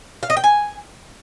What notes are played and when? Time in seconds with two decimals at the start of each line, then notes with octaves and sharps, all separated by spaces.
0.23 F5
0.30 D#5
0.37 G5
0.44 G#5